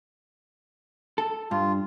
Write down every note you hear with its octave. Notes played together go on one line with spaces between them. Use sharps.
A4
G2 F4